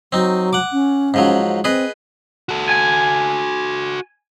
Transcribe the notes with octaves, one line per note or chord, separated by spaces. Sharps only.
F#3 C4 D#4
F#5 D6
C#4
G#2 F3 F#3
C4 G#4 B4 D#5
F#4 A4
G#5